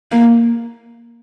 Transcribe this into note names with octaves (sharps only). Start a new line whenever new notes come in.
A#3